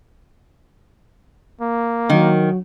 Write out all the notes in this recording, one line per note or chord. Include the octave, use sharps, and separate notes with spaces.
A#3
D#3 F#3